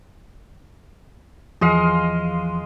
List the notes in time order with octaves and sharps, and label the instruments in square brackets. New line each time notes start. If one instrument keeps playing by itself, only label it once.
[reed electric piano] E2 E3 F3 [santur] G#3 D#5 F5